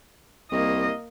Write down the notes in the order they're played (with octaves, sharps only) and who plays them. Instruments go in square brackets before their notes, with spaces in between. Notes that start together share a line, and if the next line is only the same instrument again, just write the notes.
[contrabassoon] C2 [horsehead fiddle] A#3 D#5